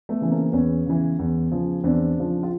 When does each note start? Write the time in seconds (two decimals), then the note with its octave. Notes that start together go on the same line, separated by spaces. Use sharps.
0.09 A3 B3
0.21 C#3 E3
0.31 A#3 C4
0.53 E2 B3 C#4
0.86 C#3 E3
1.19 E2
1.51 C#3 F3
1.84 E2 C4 D4
2.17 C#3 F3
2.43 F4